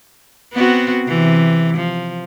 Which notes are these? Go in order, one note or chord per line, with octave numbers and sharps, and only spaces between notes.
B3 C4 F#4
C3 E3
F3